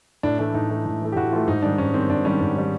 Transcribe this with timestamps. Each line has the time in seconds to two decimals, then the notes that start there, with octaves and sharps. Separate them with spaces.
0.23 A2 D4
0.39 E3 A3 D4
0.54 A2 D#4
0.70 E3 A3
0.86 A2
1.01 E3 A3
1.12 G4
1.16 A2 F#4
1.32 E3 A3 F4
1.47 G#2 D#4
1.62 D#3 G3 D4
1.78 G#2 C#4
1.94 D#3 G3 C4
2.09 G#2 D4
2.25 D#3 G3 C#4
2.41 G#2
2.56 D#3 G3